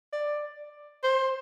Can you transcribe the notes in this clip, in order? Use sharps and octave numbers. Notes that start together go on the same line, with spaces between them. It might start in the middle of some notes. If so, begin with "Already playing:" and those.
D5
C5